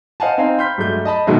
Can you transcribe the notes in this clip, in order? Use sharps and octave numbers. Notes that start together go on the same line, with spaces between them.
C5 D#5 F5 F#5 G#5 A5
C4 D#4 C5 F5 G#5 A#5
B5 C6 F6 G6 B6
G2 F#3 G#3 A3 G6
D#5 A5 B5
B2 D#3 F#3 G#3 A3